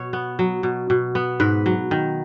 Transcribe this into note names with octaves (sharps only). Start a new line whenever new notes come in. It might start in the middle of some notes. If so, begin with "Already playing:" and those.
Already playing: B2 C#5
B3
F#3
B2
B2
B3
G#2 B4
F#3
D#3